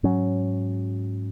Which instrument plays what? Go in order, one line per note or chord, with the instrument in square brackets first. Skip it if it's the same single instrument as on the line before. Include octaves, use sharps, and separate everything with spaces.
[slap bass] G#2 F#3 C#4